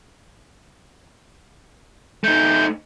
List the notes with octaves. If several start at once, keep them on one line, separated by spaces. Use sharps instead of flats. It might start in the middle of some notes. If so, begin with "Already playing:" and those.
A3 D#4 G6